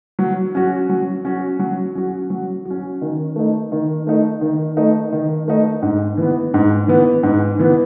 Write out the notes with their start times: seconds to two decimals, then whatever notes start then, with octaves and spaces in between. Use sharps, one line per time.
0.19 F#3
0.55 C#4 F#4
0.89 F#3
1.25 C#4 F#4
1.59 F#3
1.95 C#4 F#4
2.30 F#3
2.65 F#4
2.70 C#4
3.02 D#3
3.36 A3 D#4
3.72 D#3
4.07 A3 D#4
4.41 D#3
4.77 A3 D#4
5.13 D#3
5.48 A3 D#4
5.82 G#2
6.17 E3 B3
6.54 G#2
6.88 E3 B3
7.23 G#2
7.59 E3 B3